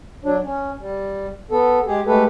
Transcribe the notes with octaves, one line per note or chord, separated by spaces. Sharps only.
F#3 D4
C#4
G3
B3 A4
G#3 G4 G#4
G#3 A3 G4 A4 B4